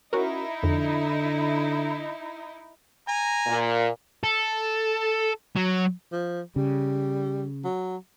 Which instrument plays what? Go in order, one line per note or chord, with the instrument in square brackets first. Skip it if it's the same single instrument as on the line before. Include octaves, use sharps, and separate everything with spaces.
[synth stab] C#4 F#4 A#4 [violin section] D#4 E4
[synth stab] F2 [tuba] D3
[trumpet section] G#5 A#5
[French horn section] A#2
[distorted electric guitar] A4
F#3
[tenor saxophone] F3
[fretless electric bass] C#3 [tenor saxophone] G3
[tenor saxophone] F#3